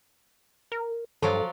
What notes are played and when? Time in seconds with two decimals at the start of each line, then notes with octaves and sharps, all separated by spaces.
0.72 A#4
1.22 G2 F3 F#3 A4 D5